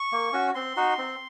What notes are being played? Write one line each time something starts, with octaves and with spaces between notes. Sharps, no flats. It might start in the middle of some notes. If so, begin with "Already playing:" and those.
Already playing: C#6
A#3
C#4 F#4
C4 C6
D#4 F#4
C4